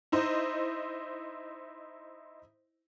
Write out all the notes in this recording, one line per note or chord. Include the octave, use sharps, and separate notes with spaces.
D#4 E4 C5 D#5